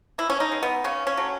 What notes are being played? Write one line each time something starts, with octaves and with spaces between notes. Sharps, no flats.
E3 E4
C#4
D#4
G#3 B3
B3
C#3 C#4
C#4
F#3 A3